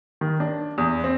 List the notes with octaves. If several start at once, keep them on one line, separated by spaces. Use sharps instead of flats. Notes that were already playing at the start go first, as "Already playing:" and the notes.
D#3
D4
E2
C4